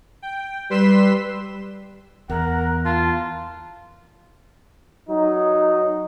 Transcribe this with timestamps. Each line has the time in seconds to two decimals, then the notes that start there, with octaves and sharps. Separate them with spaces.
0.22 G5
0.70 G3 B4 C6 E6 B6 E7
2.30 E2 A#4 F#5
2.85 F4 A5
5.08 F#3 D#4